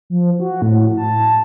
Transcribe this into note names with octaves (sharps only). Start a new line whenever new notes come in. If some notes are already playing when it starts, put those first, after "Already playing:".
F3
F#4
A2
A5